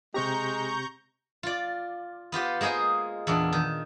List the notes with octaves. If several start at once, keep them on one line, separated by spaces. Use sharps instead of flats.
C3 G#3 C4 G4 A#5 C#6 G6
F4 D5
B3 F4 G4 C5
G#3 A#3 G#4 C5 D#5
E2 A#2 D4
D#3